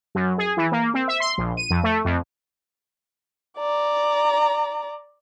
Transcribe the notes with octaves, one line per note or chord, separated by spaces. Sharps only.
F#2
G#4
E3
A#3
C4
E5
C6
A#1
D#7
F2
A3
F2
D5 A#5